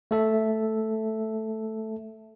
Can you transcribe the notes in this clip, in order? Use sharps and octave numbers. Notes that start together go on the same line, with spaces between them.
A3 A4 E5